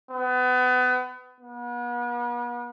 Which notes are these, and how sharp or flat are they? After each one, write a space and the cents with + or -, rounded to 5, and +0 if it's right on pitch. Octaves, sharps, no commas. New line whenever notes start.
B3 +30
B3 -40